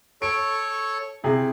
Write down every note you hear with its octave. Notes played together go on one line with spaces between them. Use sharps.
A4 C#5 C#6 D7
C3 E4 G#4